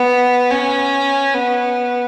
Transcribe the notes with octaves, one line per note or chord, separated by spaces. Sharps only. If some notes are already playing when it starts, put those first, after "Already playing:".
Already playing: B3
C#4
B3